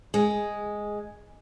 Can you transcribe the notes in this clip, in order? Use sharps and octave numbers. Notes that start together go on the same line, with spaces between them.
G#3